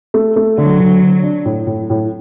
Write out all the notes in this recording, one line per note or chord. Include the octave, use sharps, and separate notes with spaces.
A3
A3
D3 F#3
D3
D3
D4
A2
A2
A2